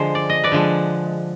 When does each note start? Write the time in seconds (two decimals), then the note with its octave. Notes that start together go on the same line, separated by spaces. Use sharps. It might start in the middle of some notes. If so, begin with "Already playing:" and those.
Already playing: D3 F3 G#3 C5
0.15 D5
0.30 D#5
0.44 B4 D5
0.52 D3 F3 G#3